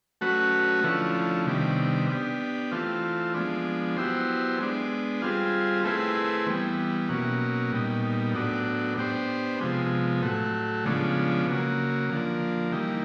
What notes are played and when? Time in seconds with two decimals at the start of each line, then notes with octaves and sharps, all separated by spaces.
0.21 F#3 A3 C#4 F#4 B4
0.84 D3 F3 A3 C#4 E4
1.47 C3 D#3 G3 B3 D4
2.09 B3 D4 G4
2.71 E3 A3 C4 F4
3.34 F3 G#3 B3 D4
3.97 F#3 B3 E4 G4 C5
4.59 G#3 B3 D4
5.22 G3 C4 F4 G#4
5.84 A3 C4 E4 G#4 B4
6.47 E3 G3 B3
7.09 B2 F#3 A#3 C#4
7.72 A#2 G3 B3 D#4
8.34 A2 F#3 B3 D4
8.97 B3 D4 G4 C5
9.59 C3 F3 G#3 B3
10.22 A2 F#3 A3
10.84 C#3 F3 G#3 B3 D4
11.47 C#3 F#3 A#3
12.09 D3 F3 A#3
12.72 E3 G3 A#3 D#4